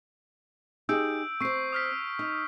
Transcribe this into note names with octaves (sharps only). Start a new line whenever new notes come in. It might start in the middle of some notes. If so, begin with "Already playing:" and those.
D#4 G4 G#4 E6 G6 D7
C4 C5 C#6 C7
D#6 F6 B6
D#4